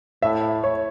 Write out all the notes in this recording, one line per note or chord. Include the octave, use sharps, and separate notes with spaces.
A2 E5
C#5